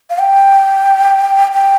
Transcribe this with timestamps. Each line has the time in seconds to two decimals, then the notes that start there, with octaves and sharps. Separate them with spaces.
0.10 F5
0.18 G5
1.52 G5